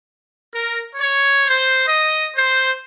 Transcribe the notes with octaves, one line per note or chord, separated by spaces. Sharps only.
A#4
C#5
C5
D#5
C5